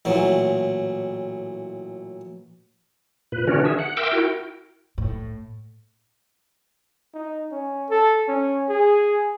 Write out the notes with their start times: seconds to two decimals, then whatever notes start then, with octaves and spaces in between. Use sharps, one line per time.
0.05 A1 A#2 E3 F#3
3.32 A#2 B4
3.47 D3 E3 C#4 D4 F#4 A#4
3.65 G#4 E5
3.79 F#5
3.97 A#4 E5 G5 C6 D6 E6
4.12 E4 F#4 A#4 G5
4.98 A2
7.14 D#4
7.52 C#4
7.90 A4
8.28 C#4
8.69 G#4